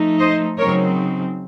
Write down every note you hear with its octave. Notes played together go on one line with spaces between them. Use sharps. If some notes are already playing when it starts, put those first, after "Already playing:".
Already playing: F3 A3 D#4
C5 D#5
C#3 F#3 C4 D#4 A#4 C#5